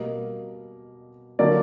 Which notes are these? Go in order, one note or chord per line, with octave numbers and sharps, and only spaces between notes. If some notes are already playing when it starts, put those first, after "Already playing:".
Already playing: B2 G3 A#3 D#5
D3 F#3 A#3 D5